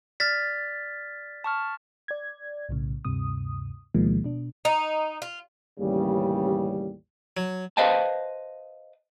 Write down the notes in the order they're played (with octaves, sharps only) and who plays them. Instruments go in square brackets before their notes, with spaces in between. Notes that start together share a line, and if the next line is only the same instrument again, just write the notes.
[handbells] D5 F6 [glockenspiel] A6 B6
[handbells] A5 C#6 F6
[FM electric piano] D5 G#6
B1 A2 C#3
D2 G2 C3 D#6
D2 B2 D#3 F3 G#3 A#3
B2 D4
[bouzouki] D#4
F4
[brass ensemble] A1 D#2 C#3 G3
[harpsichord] F#3
[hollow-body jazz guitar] B4 C5 D#5 F5 G5 A5